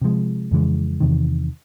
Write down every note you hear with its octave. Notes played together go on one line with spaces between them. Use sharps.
C3 F3 G#3
F2 C#3 E3 G#3
E2 C3 D#3